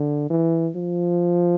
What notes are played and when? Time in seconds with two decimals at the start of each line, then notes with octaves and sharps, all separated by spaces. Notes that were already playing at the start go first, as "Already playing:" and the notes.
Already playing: D3
0.30 E3
0.75 F3